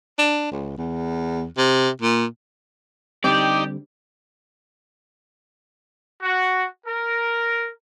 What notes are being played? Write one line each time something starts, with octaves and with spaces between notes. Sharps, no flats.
D4
C#2
E2
C3
A#2
D3 G3 C4 D#4 G4 D5 G5
F#4
A#4